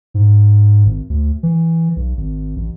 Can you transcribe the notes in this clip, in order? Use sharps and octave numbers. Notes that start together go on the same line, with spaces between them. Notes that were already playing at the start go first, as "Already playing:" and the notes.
G#2
G#1
D2
E3
B1
G#1
A1